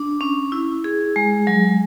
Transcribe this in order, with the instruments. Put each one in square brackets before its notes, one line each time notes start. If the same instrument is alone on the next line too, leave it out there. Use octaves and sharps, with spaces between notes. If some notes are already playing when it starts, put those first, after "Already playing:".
Already playing: [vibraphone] D4
C#4
E4
G#4
G#3
F#3